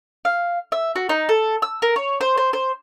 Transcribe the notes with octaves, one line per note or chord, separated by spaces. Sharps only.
F5
E5
F#4
D#4
A4
E6
A#4
C#5
C5
C5
C5